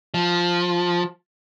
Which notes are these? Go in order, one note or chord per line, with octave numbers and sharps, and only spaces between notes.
F3